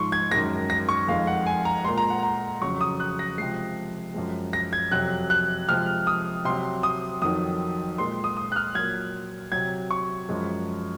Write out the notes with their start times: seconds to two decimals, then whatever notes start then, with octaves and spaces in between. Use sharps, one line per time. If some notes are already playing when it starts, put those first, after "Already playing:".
Already playing: G#2 F3 G#3 C6 C#6
0.12 G#6
0.31 F#2 D#3 G#3 A#6
0.70 A#6
0.89 C#6
1.08 F2 D#3 G#3 F5
1.27 F#5
1.47 G#5
1.65 A#5
1.84 A#2 G#3 C6
1.98 A#5
2.10 F#5
2.23 A#5
2.61 F2 C#3 F#3 C#6
2.81 D#6
3.00 F#6
3.19 A#6
3.38 C3 F3 G#3 C7
4.14 F#2 F3 G#3
4.53 A#6
4.73 G#6
4.91 F2 C3 F#3 F#6
5.30 F#6
5.68 C3 F3 G#3 F6
6.07 D#6
6.45 C3 F#3 C6
6.83 D#6
7.22 F2 D#3 F#3 D#6
7.98 A#2 G#3 C6
8.24 D#6
8.37 D#6
8.52 F#6
8.56 F6
8.75 A#2 F#3 G#6
9.52 C3 F#3 G#6
9.91 C#6
10.29 F#2 F3 G#3